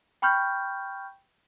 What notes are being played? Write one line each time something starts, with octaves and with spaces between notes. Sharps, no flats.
G5 B5 C#6 F6 G6